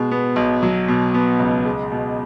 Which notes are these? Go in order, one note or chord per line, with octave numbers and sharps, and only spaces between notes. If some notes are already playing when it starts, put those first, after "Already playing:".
Already playing: B2 G#3
B3
B1
F#3
B2
B3
C#2
G#3
B2